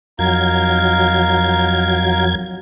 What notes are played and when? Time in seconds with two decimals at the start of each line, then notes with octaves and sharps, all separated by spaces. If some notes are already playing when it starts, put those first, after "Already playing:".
0.19 F2 F#3 D#4 A#4 F5 G#6